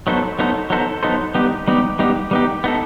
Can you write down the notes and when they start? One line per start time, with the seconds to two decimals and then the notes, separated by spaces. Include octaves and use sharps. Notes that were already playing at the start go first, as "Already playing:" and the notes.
0.07 F#3 B3 D#4 A4 C5
0.39 F#3 B3 D#4 A4 C5
0.70 F#3 B3 D#4 A4 C5
1.03 F#3 B3 D#4 A4 C5
1.35 G3 B3 D#4 G4
1.68 G3 B3 D#4 G4
1.99 G3 B3 D#4 G4
2.31 G3 B3 D#4 G4
2.64 B3 D#4 A4